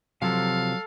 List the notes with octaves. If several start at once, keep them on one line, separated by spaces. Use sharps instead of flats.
C3 F3 F#3 A4 F5